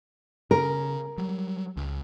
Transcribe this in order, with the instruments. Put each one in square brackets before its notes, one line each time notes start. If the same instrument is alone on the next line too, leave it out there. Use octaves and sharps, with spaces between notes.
[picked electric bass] C#3 [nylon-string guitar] A#4
[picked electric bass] F#3 G3
C#2